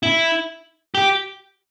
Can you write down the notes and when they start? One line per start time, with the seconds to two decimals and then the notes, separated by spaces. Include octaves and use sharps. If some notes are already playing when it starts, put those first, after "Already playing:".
0.03 E4
0.95 G4